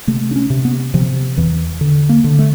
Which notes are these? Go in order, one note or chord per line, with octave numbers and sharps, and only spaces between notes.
C3 A3
D4
C#4
C3
B3
C3 F3
E2 E3
D3
A#3
D3
A3